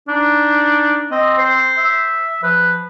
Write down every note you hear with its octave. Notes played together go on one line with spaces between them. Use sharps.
D4 D#4
C4 D#5
C5
E5
F3 B4